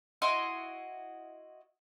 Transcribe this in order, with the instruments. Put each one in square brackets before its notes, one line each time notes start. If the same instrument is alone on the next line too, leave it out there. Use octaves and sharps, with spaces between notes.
[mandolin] E4 F#4 D#5 C6